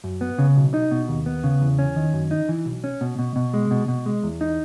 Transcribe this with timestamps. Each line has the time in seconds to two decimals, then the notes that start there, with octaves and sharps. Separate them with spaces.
0.04 F#2
0.21 B3
0.39 C#3
0.56 B1
0.74 D#4
0.91 B2
1.09 D#2
1.26 B3
1.44 C#3
1.61 E2
1.79 C#4
1.96 D#3
2.14 F#2
2.31 D#4
2.49 E3
2.66 B1
2.84 C#4
3.01 B2
3.19 B2
3.36 B2
3.54 G#3
3.71 B2
3.88 B2
4.06 G#3
4.23 E2
4.41 D#4